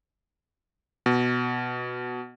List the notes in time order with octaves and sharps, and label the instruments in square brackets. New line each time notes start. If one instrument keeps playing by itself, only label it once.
[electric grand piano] B2